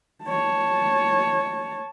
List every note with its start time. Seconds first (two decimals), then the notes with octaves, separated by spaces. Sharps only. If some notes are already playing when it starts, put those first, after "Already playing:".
0.25 C#5 A5